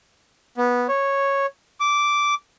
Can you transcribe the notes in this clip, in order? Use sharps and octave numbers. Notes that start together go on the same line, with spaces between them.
B3
C#5
D6